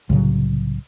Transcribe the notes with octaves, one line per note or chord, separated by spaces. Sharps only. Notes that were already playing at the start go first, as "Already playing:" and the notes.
C2 A2 C#3 F#3